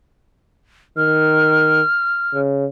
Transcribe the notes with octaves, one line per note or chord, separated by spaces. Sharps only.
D#3 F6
C#3